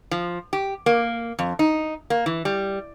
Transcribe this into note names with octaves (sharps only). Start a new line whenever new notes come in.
F3
G4
A#3
F2
D#4
A#3
E3
G3